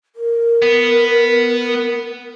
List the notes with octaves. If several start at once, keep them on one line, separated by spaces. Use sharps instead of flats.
A#4
B3